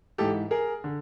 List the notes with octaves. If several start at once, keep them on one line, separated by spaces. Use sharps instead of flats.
G#2 E3 G4 A4
G#4 A#4
D3